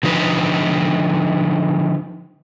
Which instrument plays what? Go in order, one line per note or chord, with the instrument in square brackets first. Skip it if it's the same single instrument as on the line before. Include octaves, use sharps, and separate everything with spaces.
[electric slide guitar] D3 F3 D#4 B4